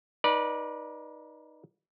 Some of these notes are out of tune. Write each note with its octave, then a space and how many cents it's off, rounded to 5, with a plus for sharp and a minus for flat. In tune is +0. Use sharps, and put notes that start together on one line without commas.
D#4 +0 B4 -30 D5 +0